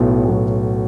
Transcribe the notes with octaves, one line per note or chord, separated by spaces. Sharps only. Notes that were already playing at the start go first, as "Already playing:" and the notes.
Already playing: B1 A2 F#3 B3
B1 A2 F#3 B3